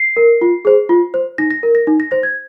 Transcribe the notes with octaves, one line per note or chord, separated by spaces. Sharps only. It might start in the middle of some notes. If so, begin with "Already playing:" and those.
Already playing: C7
A#4
F4
G#4 C5
F4
C5
D#4 A#6
A#6
A#4
A#6
D#4
A#6
C5 A#6
G#6